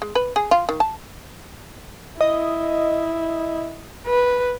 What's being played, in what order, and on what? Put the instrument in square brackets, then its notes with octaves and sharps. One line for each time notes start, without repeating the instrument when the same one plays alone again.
[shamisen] G#3
B4
G#4
F4
D#3
A5
[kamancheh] E4 [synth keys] D#5
[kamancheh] B4